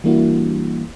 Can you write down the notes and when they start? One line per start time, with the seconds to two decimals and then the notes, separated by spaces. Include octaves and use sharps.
0.04 E3 G3 A#3 D4 E4 F#4